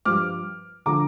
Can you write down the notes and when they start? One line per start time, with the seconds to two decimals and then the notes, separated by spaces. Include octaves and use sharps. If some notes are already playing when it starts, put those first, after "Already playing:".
0.05 G2 F3 D6 F6
0.86 D3 F3 A#5 D6